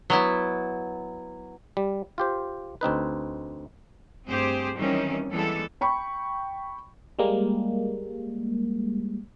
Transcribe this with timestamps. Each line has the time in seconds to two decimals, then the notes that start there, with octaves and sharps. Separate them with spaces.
0.10 F#3 B3 E4
1.77 G3
2.18 F4 G4 C5
2.81 D2 C4 D#4 B4
4.27 G2 A3 C4 G4 G#4 C5
4.75 D#3 E3 F#3 G3 C4 C#4
5.32 E3 G3 G#3 B3 A4
5.81 G5 B5 C#6
7.19 G3 G#3 A#3